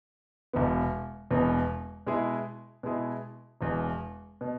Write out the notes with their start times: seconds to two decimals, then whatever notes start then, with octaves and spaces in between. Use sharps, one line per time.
0.53 E1 E2 B2 B3
1.31 E1 E2 B2 B3
2.07 B2 G#3 E4 G#4
2.83 B2 G#3 E4 G#4
3.61 E1 E2 B2
4.41 B2